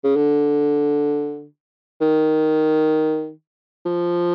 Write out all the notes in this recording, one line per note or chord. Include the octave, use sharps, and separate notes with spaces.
C#3
D3
D#3
F3